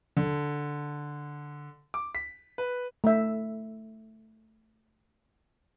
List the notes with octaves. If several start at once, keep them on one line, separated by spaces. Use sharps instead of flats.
D3
D6
B6
B4
A3 E5